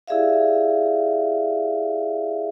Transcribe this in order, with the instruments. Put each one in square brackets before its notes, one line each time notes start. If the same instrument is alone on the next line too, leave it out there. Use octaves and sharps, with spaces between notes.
[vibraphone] E4 G4 G#4 D5 E5 F5